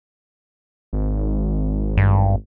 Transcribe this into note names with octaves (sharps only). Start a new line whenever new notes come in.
G#1
G2